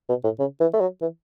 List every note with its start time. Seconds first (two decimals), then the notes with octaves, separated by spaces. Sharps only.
0.09 B2
0.24 A2
0.39 C#3
0.60 E3
0.73 A3
0.80 F#3
1.02 E3